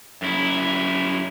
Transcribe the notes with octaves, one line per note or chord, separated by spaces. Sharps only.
F#2 E4